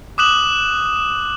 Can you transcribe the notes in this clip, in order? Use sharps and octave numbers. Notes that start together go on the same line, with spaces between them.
D6 D#6 F#6 E7 F#7